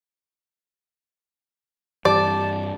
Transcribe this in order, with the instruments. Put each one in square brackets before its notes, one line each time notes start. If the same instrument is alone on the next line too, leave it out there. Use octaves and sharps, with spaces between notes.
[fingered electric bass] G2 E3 [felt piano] G4 [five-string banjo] D5 [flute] A5